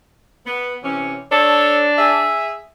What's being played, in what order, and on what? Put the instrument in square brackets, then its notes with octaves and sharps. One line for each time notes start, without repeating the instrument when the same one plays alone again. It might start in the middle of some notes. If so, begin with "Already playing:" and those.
[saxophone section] B3
C3 E3 C#4
[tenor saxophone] D4 [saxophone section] A4 C#5
[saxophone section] G#4 E5